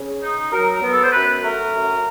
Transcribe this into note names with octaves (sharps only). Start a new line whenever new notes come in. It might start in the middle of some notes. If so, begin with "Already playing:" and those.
Already playing: C#3
D#4
F#3 A#4
A#4
B3
A4
C5
F#2 B4
A3 A#4
F#2